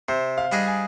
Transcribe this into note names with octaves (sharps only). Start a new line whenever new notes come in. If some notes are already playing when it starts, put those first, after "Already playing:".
C3 C5
F5
G3 D4 G#4 D#5
G#5